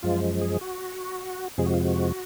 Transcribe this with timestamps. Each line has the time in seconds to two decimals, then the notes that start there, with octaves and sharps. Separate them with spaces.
0.03 F#2 F3 G#3 F4
0.42 G#4
0.61 F#4
1.58 F2 C3 F3 G#3 G#4
1.66 F#4
1.74 F4
1.80 F#4